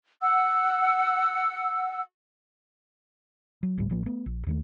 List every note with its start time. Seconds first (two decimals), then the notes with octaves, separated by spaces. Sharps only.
0.22 F#5 E6
3.63 F#3
3.77 G1 D2 A2 G3
3.90 A1 F3 A#3
4.06 A3 B3
4.26 A#1
4.47 D#2 D#3 A3